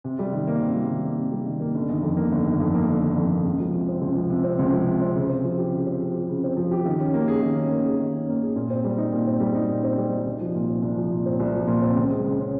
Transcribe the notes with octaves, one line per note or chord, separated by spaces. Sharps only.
C3
G3
D#3
A#3
C3
G3
D#3
A#3
C3
G3
D#3
A#3
G1
D#3
F2
A#3
G1
D#3
F2
A#3
G1
D#3
F2
A#3
C#2
F3
C3
C4
C#2
F3
C3
C4
C#2
F3
C3
C4
C#3
C4
F3
G4
C#3
C4
F3
G4
C#3
C4
F3
G4
D#3
C#4
A#3
G#4
D#3
C#4
A#3
G#4
D#3
C#4
A#3
G#4
A#2
C4
G3
D#4
A#2
C4
G3
D#4
A#2
C4
G3
D#4
C2
F3
A#2
C4
C2
F3
A#2
C4
C2
F3
A#2
C4
C#2
G#3
C#3
C#4